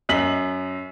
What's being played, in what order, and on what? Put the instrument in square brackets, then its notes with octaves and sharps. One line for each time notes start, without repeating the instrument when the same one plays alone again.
[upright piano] F#2 D#5 B6 F#7